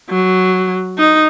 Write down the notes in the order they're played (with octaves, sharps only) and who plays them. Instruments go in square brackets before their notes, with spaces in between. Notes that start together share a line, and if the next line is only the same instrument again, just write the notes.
[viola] F#3
D#4